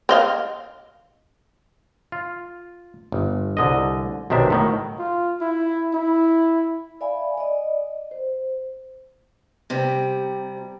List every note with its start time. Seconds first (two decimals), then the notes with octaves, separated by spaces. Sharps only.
0.09 C4 D#5 F5
2.12 F4
3.12 G1
3.57 C2 D3 D#5
4.30 B1 C3 D#3 D4 E5
4.50 A2 D#3 F#3
4.99 F4
5.41 E4
5.94 E4
7.01 D5 E5 F5 G#5 B5
7.37 D5 D#5
8.11 C5
9.70 C3 G3